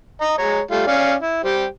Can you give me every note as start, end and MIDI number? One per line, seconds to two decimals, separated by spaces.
0.21 0.36 75
0.21 0.36 82
0.38 0.61 56
0.38 0.61 73
0.38 0.61 82
0.71 0.84 55
0.71 0.84 57
0.71 0.84 65
0.87 1.14 61
0.87 1.14 74
0.87 1.14 77
1.21 1.41 64
1.44 1.65 55
1.44 1.65 67
1.44 1.65 72